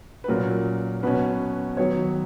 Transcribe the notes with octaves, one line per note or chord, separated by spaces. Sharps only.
B4
A#2 F#3 C#4 A#4
B2 F#3 C#4 B4
D#3 F#3 B3 C#5